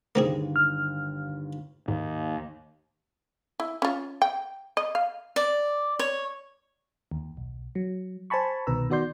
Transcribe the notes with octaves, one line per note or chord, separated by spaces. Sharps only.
G1 D#2 A#3 C4 G#4
F6
D#2 G#2
E4
C#4 F4
G5
D#5
F5
D5
C#5
D#2
B1
F#3
C5 G#5 A5 B5 C#6
C2 B2 D#3 B4 A#5 E6
D#3 B3 F#4 D5 C6 G6